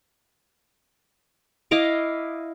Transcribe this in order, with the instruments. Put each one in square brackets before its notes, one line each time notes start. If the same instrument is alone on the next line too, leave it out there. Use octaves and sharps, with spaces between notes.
[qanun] E4 D#5 F5 D6